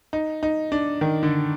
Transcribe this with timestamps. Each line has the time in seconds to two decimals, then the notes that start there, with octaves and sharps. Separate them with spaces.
0.13 D#4
0.43 D#4
0.72 D4
1.01 D#3
1.23 D3